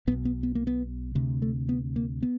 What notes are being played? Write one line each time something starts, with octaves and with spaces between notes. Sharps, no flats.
B1 B2 B3
B3
B3
A#3
B3
D2 C3
A3
B3
A#3
B3